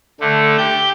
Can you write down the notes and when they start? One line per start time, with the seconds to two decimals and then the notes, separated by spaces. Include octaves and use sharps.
0.20 D3 A3
0.58 G4 G6